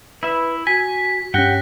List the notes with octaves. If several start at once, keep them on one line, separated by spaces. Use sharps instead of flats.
E4 B4 E5
F#4 G#5 B6
G2 C#4 G4 F#5 G5 F#6 A#6